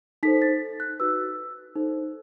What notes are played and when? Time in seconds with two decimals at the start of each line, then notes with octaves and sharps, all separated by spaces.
0.23 D#4 A4 C5 B6
0.42 A6
0.80 F#6
0.99 D#4 F#4 B4 E6
1.75 D#4 A4 C5